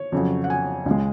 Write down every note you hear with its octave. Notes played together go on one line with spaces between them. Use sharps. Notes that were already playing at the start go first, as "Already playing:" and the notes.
Already playing: C#5
F2 C#3 F#3
F#5
G#5
C#2 C#3 G#3